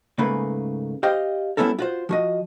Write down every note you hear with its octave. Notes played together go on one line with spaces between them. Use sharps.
G#2 C#3 A3 A#3 B4
G4 C5 D#5 F5 G5
G3 B3 C#4 E4 A4 A#4
F4 F#4 C5
F3 F#4 D#5